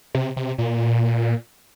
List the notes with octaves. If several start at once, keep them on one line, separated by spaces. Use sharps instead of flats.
C3
C3
A#2